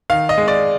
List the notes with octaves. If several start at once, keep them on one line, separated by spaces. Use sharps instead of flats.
D#3 F5
D#5
G#3
D5